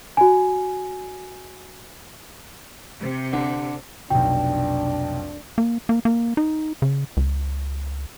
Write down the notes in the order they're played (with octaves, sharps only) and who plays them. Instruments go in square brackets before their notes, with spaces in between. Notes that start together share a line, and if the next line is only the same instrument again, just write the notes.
[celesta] F#4 G#5
[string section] C3 C#7
[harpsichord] D3
[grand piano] F1 B1 [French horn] D4 [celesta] G5
[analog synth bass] A#3
A#3
A#3
D#4
C#3
C#2